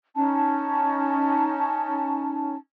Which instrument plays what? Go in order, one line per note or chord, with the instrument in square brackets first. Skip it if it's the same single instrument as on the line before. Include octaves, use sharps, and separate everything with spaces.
[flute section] C#4 D#4 A5